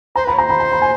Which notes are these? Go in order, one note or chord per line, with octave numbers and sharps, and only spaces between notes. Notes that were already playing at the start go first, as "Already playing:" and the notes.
C5 A#5
B4 B5
C#5
C5 A#5
B5
A#5
B5
G#5